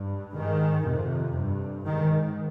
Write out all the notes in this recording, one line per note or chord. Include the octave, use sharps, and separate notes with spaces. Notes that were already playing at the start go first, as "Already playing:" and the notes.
Already playing: G2
G#2 D#3
F2 C3
G2
G#2 D#3